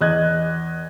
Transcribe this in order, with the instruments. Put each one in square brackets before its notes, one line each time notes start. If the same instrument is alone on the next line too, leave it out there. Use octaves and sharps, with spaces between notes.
[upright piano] E2 D#5 F#6 G#6